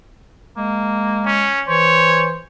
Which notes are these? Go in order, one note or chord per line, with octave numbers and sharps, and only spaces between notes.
G#3 A#3
C#4
E3 C5 C#5